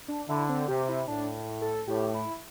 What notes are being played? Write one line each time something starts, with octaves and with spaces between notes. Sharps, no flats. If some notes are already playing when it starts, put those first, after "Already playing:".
D4
D3 E4
C4
C3 G4
E4
A2 D4
A4
A2 G4
E4